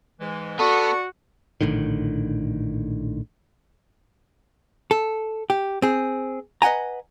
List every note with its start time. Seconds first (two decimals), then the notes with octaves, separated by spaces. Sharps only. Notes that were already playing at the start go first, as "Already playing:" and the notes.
0.20 G#2 E3 G#3
0.59 B3 F#4 A4 D5 C#6
1.61 A#1 A2 D3 D#3
4.91 A4
5.50 G4
5.82 C4 G#4
6.62 B4 D#5 F#5 G#5 A#5